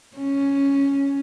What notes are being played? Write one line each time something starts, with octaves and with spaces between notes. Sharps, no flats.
C#4